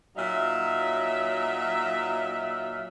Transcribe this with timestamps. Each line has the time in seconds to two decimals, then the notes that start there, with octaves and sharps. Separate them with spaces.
0.16 A#2 F#3 D#4 E5